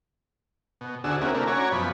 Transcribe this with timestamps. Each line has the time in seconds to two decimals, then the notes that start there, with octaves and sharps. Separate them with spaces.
0.81 B2
1.04 D2 D4 F#4 G#4 E6
1.21 A#3 C4 C#4 E4 F#4 G#4
1.34 C3 A3 D4 E4 A#4
1.47 C#4 F#4 C#5 D5 G#5 A#5
1.72 F#2 B2 F3 B5